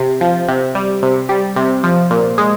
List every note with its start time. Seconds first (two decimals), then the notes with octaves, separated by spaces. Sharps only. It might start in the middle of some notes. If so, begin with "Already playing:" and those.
Already playing: C3
0.21 F3
0.48 C3
0.75 G3
1.03 C3
1.29 G3
1.56 C3
1.84 F3
2.11 A#2
2.38 G#3